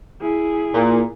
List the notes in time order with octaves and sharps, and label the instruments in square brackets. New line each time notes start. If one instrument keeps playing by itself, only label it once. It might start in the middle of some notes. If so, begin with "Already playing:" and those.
[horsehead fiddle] E4 G#4
[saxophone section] A#2